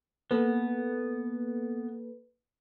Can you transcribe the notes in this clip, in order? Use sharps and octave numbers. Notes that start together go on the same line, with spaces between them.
A#3 B3 A4 B4